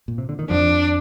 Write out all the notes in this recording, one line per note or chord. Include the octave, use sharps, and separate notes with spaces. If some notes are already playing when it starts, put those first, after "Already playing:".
A#2
C3
D3
D#3
F2 F3 D4